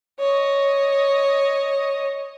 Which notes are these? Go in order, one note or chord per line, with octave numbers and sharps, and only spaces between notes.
C#5 D#5